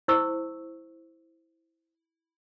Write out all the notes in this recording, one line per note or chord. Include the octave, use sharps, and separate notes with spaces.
E4 C5 C#6 E6